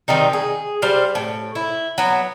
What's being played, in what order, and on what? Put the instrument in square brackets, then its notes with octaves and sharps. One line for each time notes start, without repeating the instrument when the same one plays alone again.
[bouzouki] D#3 G3 C4 D#4
G#4
G3 C5 F5
A2
E4
F#3 B3